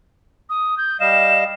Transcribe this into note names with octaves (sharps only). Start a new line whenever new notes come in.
D#6
G6
G3 D#5 F5 E7